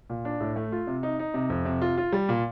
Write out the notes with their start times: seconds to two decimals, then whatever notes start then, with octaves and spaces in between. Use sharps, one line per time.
0.10 A#2
0.25 D4
0.41 A2
0.56 A3
0.72 F4
0.87 C3
1.03 D#4
1.19 D#4
1.34 C3
1.50 F2
1.65 C3
1.82 F4
1.97 F4
2.13 G3
2.29 A#2